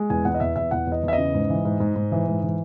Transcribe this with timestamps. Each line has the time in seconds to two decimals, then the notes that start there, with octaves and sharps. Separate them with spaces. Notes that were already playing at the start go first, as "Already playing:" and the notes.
Already playing: G#3
0.10 E2 G#5
0.25 E2 F#5
0.35 D#5
0.40 E2 E5
0.56 E2 E5
0.71 E2 F#5
0.87 E2
0.92 D#5
1.04 E2 E5
1.13 D#5
1.18 C#3
1.34 G#2
1.50 E3
1.65 G#2
1.80 G#2
1.96 G#2
2.12 E3
2.28 G#2
2.43 E3